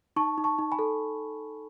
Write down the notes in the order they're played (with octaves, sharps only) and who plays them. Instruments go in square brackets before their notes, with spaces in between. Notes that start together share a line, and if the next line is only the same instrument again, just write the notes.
[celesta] D#4 A5 C#6
D#4
A5 C#6
D#4
G#5 B5
A4